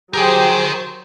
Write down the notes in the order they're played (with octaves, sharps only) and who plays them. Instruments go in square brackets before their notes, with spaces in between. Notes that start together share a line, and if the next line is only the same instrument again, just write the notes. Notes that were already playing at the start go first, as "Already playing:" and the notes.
[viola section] F#3 C5 [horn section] G4 G#4 [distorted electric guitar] A#4 G5